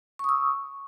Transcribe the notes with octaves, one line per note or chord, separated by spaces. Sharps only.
C#6 D#6 E6